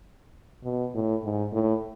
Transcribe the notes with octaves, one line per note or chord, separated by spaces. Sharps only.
B2
A2
G#2
A2